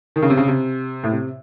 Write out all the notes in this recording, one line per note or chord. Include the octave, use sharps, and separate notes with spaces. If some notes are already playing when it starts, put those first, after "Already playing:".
D#3
C#3
C3
C#3
C3
A2
C3